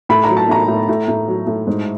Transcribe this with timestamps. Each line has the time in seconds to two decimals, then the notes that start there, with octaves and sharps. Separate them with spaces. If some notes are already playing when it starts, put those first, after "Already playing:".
0.09 A2 B5
0.24 A#5
0.30 F#3
0.37 A5
0.49 A2 A#5
0.68 A2
0.89 A2
1.08 A2
1.28 F#3
1.47 A2
1.67 G#2